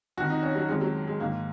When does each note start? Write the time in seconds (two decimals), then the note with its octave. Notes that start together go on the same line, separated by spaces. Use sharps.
0.17 F2 D#3 F#4
0.30 D#4
0.43 C#4
0.55 F#3
0.68 F2 D#3 G#3
0.81 F#3
1.07 G#3
1.20 G#2 D#3 A#3